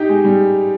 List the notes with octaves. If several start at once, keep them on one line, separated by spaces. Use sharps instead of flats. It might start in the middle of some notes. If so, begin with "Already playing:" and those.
Already playing: D#4 G4
G#3
G3